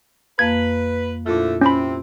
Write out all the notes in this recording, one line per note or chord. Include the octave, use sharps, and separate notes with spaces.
F2 A#3 B4 F5 G#6
A#2 D3 F3 A3 E4 F4
C3 C4 C#4 B5